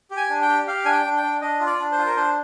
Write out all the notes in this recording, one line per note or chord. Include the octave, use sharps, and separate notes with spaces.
G4
G#5
D4
G5
G4
G4 F5
D4 G#5
G5
D4
G5
D4
D4 D#5
F4
D5
D4
C5
F4
A#4
D4 C5